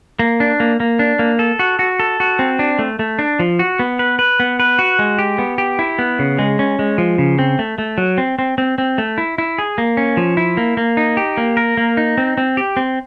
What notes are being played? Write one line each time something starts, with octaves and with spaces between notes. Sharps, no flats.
A#3
D4
A#3
A#3
D4
A#3
A4
F#4
F#4
A4
F#4
C4
D4
A3
A3
D4
F3
F#4
B3
B4
B4
B3
B4
F#4
G#3
G4
B3
G4
E4
B3
C#3
G#3
C#4
G#3
F3
C#3
C4
A3
A3
F#3
C4
C4
C4
C4
A3
E4
E4
G#4
A#3
C#4
F3
E4
A#3
A#3
D#4
G4
A#3
A#4
A#3
D#4
C4
C4
G4
C4